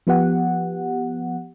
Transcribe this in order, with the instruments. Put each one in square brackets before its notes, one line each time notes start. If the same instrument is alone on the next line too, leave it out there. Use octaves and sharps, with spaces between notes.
[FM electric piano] F3 B3 G4 F#5